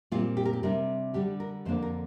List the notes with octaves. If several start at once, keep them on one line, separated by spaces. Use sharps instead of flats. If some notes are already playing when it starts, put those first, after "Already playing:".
A#2 G3 C4 F4
G4
A#4
G4
C3 G3 D4 A#4
D3 G3 D4 G4
A#4
F2 D3 A#3 D4 C5
A#4